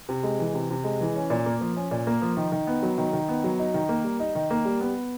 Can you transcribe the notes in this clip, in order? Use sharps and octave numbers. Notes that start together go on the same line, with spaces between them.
C3
G#3
E3
C3
C3
G#3
E3
C#4
A#2
A#3
F3
C#4
A#2
A#3
F3
D#3
D#3
B3
F#3
D#3
D#3
B3
F#3
D#4
D#3
A#3
G3
D#4
D#3
A#3
G3
B3